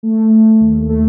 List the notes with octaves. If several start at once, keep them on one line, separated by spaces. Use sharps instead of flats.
A3
A3
D#2
A3